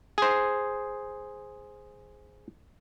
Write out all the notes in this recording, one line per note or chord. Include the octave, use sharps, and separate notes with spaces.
G#4 C5